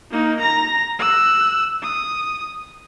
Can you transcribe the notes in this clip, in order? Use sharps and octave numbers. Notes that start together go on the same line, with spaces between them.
A#3 D#4
A#5 A#6
E6 F#6
D#6